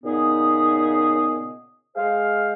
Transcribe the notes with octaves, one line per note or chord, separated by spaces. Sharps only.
A#2 C#3 B3 D#4 G#4 D#5
G#3 G#4 C5 F5